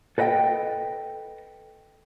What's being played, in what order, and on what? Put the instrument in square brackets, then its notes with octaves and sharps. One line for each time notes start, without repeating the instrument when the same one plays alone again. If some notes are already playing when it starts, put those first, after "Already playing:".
[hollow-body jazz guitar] A4 B4 D#5 F#5 G5